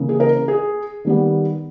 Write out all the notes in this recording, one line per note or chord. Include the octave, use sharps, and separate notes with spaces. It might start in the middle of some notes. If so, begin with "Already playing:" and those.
Already playing: C#3 E3 A#3
G#4
A#4
G#4
D#3 G3 B3